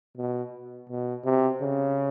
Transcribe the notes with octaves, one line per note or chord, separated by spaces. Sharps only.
B2
B2
C3
C#3